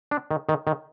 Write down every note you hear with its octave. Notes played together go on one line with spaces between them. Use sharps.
D4
D#3
D#3
D#3